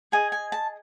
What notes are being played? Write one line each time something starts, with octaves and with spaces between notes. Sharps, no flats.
G#4 D#5 G#5
G#5
A5